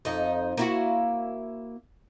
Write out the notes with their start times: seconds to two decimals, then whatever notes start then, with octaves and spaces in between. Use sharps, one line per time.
0.05 F2 D#4
0.57 A#3 E4 F#4